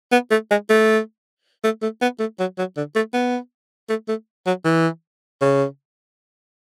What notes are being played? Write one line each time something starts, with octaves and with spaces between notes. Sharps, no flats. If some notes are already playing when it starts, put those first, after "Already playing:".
B3
A3
G#3
A3
A3
A3
B3
A3
F#3
F#3
D3
A3
B3
A3
A3
F#3
E3
C#3